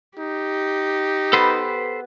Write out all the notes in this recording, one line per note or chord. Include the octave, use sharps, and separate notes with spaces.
D#4 G4
B3 A4 B4 C5